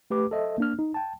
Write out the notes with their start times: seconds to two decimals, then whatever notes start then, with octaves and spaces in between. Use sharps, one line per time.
0.10 A3 G4 B4 D6
0.31 A4 C5 D#5 E5
0.58 A#3 D4 F6
0.79 D#4
0.94 G5 A5